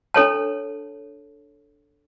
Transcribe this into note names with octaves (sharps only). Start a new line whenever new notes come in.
D4 A4 C#5 A5